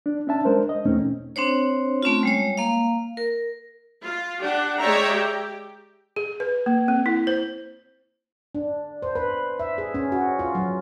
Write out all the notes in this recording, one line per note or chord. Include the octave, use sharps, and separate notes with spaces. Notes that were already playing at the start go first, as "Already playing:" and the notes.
D4
C#4 D4 E5 A5
G#3 D4 A#4 C5
D#5
E2 B2 A3 C4 C#4 D#4
C4 D4 C5 C#5
A3 C4 C#4 F4
G3 G#3 C#5
A#3 F5
A#4
F4
D4 G4 F#5
G#3 C#5 D5 E5 G5 A#5
G4
G#4
B4
A#3
C4
E4
C5
D4
C5
B4
E5
G#4
C#4
F#4
F4
F#3